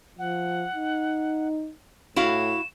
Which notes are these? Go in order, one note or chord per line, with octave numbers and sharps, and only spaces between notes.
F3 F#5
D#4
A2 E4 F#4 F5 E7